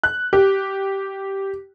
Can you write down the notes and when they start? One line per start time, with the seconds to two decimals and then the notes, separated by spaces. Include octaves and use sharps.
0.03 F#6
0.33 G4